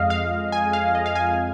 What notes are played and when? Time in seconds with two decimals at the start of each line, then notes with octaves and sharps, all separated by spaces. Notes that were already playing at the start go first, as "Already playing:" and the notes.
Already playing: F2 G#3 D#5 F5
0.10 F5
0.52 G#5
0.73 F5
0.95 D#5
1.06 F5
1.15 G#5